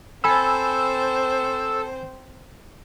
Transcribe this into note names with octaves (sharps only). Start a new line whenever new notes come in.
C4 A4 C5 G#5 B5 E6